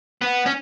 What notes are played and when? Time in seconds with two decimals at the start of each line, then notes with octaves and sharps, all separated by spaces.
0.21 B3
0.46 C#4